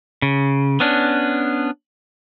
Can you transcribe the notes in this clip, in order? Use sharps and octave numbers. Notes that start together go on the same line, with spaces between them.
C#3
B3 C#4 D4